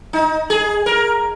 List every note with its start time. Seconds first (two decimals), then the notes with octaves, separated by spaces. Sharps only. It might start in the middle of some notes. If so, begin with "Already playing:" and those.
0.13 D#4
0.50 G#4
0.86 A#4